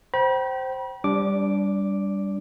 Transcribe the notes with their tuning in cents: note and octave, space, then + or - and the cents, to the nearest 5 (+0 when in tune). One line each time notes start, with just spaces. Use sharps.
C5 +0 G5 -30 B5 -40
G3 +10 D4 -25 D6 +0